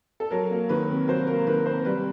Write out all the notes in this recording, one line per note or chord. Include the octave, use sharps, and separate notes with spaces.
A4
F#3 A#4
A#3
D#3 B4
C3
F#3 C5
A#3 A#4
D#3 B4
C3 C5
G3 B4